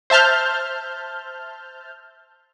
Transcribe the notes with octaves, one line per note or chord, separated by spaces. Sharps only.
C5 E5 A5 F6 G6